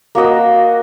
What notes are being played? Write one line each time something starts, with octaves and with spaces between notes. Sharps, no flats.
A#3 F#4 D#5 E6